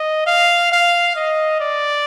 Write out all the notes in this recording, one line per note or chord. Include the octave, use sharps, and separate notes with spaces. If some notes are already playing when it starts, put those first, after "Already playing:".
Already playing: D#5
F5
F5
D#5
D5